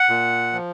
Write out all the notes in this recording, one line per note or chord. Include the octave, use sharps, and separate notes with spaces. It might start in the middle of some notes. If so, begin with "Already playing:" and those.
Already playing: F#5
A#2
F3